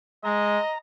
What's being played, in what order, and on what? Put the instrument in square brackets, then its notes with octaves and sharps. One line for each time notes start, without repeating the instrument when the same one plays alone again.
[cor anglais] G#3 [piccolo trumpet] D#5 [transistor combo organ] A#5